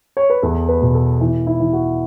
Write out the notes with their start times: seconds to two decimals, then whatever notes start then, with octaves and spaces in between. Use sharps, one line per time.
0.17 C#5
0.30 B4
0.42 E2 A4
0.69 B4
0.82 B2
0.95 A4
1.21 E3
1.47 E4
1.60 E3
1.73 F#4